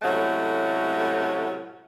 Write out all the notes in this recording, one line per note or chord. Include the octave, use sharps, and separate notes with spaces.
A2 C3 F#3 G#3 A3 C#4